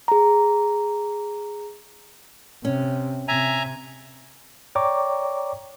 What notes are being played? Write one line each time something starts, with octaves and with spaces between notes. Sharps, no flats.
G#4 A#5
C3 C#4
C3 E5 G#5 A#5
C#5 D5 G5 A#5 C#6 D6